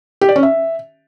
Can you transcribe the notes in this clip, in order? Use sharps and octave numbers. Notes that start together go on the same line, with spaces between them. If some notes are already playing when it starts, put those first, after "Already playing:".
G4
D5
C#4
E5